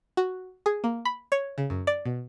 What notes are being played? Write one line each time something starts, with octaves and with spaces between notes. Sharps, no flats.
F#4
G#4
A#3
B5
C#5
C#3
F#2
D5
B2